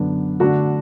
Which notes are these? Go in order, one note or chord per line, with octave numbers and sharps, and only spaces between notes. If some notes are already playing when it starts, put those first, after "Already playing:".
Already playing: F#2 D3 B3 D4
D3 A3 D4 F#4